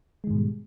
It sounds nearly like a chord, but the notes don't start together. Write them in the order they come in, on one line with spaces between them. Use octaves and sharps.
G#3 D#3 G#2 B2 G3